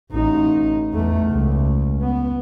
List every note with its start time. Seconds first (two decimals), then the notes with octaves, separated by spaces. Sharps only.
0.12 A1 D#4
0.93 E2 A3
1.30 C#2
2.01 B3